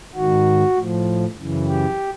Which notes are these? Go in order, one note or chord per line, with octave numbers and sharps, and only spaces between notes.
G#2 D#3 F#4
A2 F3
F#2 C#3 E3
G4